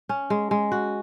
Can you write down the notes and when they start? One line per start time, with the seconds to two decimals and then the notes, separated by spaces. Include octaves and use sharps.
0.09 C#4
0.30 G#3
0.51 G#3
0.72 F#4